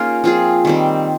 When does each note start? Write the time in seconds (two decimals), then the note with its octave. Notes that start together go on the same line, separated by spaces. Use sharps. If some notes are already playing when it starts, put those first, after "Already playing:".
Already playing: A#3 C#4 D#4 F4 G#4 A#4
0.24 F3 C4 F4 G#4
0.65 D#3 G3 C4